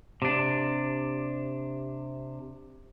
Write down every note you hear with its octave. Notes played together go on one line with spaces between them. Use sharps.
C3 D4